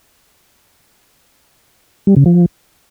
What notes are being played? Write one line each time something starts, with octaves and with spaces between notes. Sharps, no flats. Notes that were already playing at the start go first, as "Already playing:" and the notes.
G3
C#3
F3